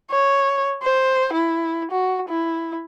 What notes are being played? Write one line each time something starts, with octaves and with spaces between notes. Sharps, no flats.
C#5
C5
E4
F#4
E4